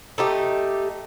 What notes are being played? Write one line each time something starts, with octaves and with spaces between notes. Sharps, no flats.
A3 D#4 G4